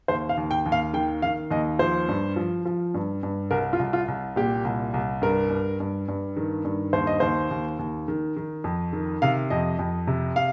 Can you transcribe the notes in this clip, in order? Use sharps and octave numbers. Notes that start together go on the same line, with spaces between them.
D#2 C5
F5
D#2
G5
D#2
F5
D#3 G5
D#3 F5
D#2 D#5
F3 C5
G2
F3
F3
G2
G2
C2 A#4
F4
C2
F4
C2
A#2 G4
C2
C2
G2 A#4
G2
G2
G2
D#3
G2
D#2 C5
D#5
D#2 C5
D#2
D#2
D#3
D#3
F2
D#3
C3 F5
F2 D#5
F2
C3
F5